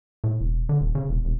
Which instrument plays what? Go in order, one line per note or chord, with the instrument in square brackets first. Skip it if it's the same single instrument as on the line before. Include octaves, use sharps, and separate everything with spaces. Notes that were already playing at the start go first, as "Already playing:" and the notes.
[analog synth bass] A2
E1
D3
D#1
C#3
E1
E1